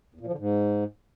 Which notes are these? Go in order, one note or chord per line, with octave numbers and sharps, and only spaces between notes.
E2
A#2
F3
D3
G#2